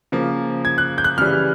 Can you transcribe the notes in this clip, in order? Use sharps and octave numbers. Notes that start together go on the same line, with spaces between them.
C#3 F3 A#3
G#6
F#6
G6
F#6
C#3 E3 G3 F6